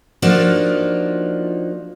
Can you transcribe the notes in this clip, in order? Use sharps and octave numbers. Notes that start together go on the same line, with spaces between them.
F3 A#3 D4 D#4 F4 F#4